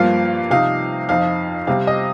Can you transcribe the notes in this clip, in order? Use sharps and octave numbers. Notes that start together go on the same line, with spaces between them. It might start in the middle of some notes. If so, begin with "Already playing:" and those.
Already playing: G2 F3 A#3 F4 F5
C3 F3 D#4 F5
F2 F3 D#4 F5
C3 G3 C4 F5
D#5